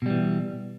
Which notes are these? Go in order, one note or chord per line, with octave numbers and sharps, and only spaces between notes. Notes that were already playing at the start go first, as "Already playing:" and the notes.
B2 E3 G3